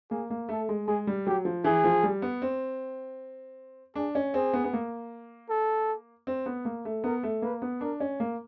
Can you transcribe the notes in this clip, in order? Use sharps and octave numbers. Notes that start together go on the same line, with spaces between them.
A#3 G#4
A#3
A3 A4
G#3
G#3 G#4
G3
F#3 G4
F3
E3 G#4
F3
G3
B3
C4
D4 G#4
C#4
C4 G#4
B3
B3
A#3
A4
C4
B3
A#3
A3
B3 A#4
A3
A#3 B4
B3
D4 A#4
C#4
A#3